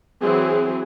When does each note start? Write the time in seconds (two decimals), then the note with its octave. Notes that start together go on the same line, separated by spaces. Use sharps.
0.20 E3 F#3 C4 G#4